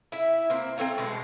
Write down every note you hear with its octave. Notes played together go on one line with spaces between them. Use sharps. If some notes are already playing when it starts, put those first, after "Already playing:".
E4 E5
A#3 C4
C4 A4 C#5 F5
B2 G#3